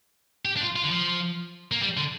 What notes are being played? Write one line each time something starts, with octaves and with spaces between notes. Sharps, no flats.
G4
D4
F4
F4
D3
F3
A#3
G3
D3